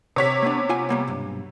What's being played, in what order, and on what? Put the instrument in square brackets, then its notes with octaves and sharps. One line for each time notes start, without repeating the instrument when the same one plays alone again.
[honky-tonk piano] C3 C#5 B6
[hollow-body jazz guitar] A#3 B3 D4
F4 F#5 G#5
G3 A#3 B3
B1 G2